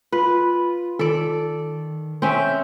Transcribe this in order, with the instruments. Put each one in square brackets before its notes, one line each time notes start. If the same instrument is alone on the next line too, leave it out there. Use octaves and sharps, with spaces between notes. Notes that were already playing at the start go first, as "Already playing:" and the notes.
[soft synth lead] F4 [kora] B4
[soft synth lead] D#3 [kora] A4 D5
[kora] C4 C#4 E5 [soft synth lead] G6